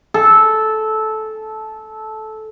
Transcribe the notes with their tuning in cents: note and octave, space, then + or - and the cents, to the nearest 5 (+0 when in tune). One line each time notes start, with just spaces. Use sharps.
A4 -15